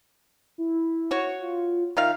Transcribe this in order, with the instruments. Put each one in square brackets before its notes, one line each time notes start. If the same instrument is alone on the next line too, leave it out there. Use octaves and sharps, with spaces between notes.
[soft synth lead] E4
[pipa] F#4 C#5
[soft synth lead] F4
[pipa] D#3 F4 F5 [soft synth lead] E5